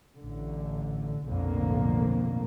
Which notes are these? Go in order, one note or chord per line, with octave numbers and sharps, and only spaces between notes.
A1 D3
B1 F2 A2 D3 A#3